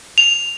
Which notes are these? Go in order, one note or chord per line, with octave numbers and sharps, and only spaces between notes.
F7